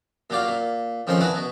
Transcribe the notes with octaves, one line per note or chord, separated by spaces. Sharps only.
A#2 F#3 G4 D5 F5
A#2
F2 D#3 F3 C4 C#4 C6
D4 E4 F#4 G#4 A#4 B4
B2 B3